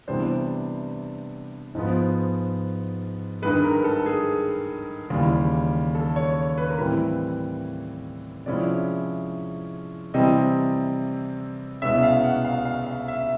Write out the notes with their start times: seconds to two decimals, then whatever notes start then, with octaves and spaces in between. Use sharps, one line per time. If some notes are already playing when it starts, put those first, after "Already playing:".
0.08 C3 E3 G3 B3 D4 C5
1.75 G#2 F3 G#3 B3
3.42 G2 D#3 G#3 B4
3.64 A#4
3.84 A4
4.06 G#4
5.10 D#2 C#3 E3 G3
5.95 A4
6.16 C#5
6.58 B4
6.70 A#4
6.78 A2 E3 G3 C4 B4
8.46 C3 F3 G#3 C#4 E4 D5
10.14 C3 E3 G3 C4 D#5
11.82 C2 B2 G#3 C#4 E5
12.03 F5
12.24 F#5
12.45 F5
12.65 F5
12.87 F5
13.08 E5